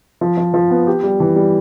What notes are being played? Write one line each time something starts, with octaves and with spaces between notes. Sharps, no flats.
F3
F3
F3
B3
G4
G3
E3
G3